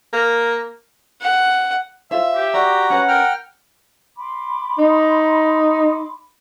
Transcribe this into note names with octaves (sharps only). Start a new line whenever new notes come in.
A#3
F#5
F4 C5 E5
G4
F#4 D5 A#5
C#4 B4 F#5
A#4 G5 F6
B5 C6 D6
D#4